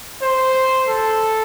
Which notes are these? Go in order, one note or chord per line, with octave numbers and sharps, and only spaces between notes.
C5
A4